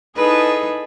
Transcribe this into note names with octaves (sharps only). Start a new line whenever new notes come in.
D#4 E4 G#4 A4 B4